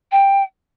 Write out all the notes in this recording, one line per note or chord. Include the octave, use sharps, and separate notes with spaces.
G5